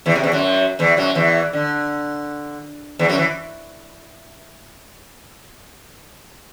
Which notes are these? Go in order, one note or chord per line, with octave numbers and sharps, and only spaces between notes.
E2 E3
C3
E2 E3
F#2 F#3
E2 E3
F#2 F#3
E2 E3
D3
E2 E3
F#2 F#3
E3